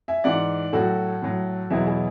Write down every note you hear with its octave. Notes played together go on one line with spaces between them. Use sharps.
E5 G#5
G#2 E3 D5 F#5
A2 F#3 F#4 A4
A2 F#3
E2 B2 F#3 E4 G#4
E4 G#4